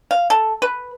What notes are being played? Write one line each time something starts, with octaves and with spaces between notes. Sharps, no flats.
F5
A4
B4